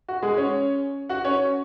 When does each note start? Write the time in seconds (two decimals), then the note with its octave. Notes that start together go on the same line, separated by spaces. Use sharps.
0.09 F#4
0.22 G#3 G#4
0.37 C#4 C#5
1.09 F#4 F#5
1.25 C#4 C#5